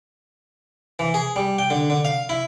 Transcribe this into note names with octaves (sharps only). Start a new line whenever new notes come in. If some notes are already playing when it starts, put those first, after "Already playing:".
E3
G#4
G3
G5
D3
D3
F5
E4